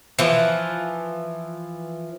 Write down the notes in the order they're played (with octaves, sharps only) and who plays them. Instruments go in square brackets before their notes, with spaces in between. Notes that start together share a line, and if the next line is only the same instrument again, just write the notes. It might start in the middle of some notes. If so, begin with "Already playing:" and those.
[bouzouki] E3 F3